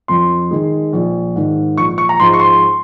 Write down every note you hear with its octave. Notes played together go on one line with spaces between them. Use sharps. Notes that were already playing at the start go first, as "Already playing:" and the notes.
F2 C6
D#3 G#3
A#1
G#2 D#3
A#1 C#6
C#6
A#5
G#2 F3 G#3 C6
C#6
C6